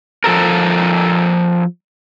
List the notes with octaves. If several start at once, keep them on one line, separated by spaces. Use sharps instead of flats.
F3 A4 A#4